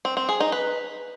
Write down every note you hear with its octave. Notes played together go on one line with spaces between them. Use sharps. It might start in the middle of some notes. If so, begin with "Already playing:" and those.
C4
C4
G#4
D#4
B4